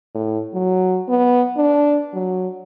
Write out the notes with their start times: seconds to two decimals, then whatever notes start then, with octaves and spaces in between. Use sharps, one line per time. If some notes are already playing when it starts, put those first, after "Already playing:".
0.15 A2
0.54 F#3
1.08 B3
1.57 D4
2.14 F#3